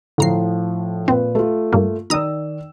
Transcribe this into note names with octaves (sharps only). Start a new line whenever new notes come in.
A2 D3 F3 A#5 C7
A#2 C4 B4
A3 F4
G2 A#3
D#3 D5 A#5 D#6 E6